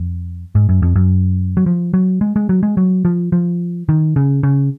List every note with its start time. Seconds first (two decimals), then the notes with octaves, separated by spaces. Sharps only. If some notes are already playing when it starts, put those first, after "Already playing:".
Already playing: F2
0.55 G#2
0.69 F#2
0.82 F2
0.96 F#2
1.57 F#3
1.66 F3
1.94 F#3
2.21 G#3
2.36 G#3
2.49 F#3
2.63 G#3
2.77 F#3
3.05 F3
3.32 F3
3.89 D#3
4.16 C#3
4.43 C#3